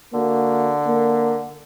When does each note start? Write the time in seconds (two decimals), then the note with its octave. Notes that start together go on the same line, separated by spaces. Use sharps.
0.14 D3 A#3 F#4
0.87 A#3